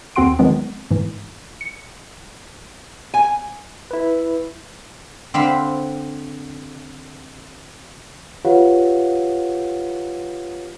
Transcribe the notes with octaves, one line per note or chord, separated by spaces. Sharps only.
D#2 C4 F#4 F#5 C6 D7
D#3 F3 F#3 G#3 B3 C4
G#2 E3
C#7
G#5
E4 B4
D3 C4 C5 F5 B5
F4 G4 B4 C#5 F5 F#5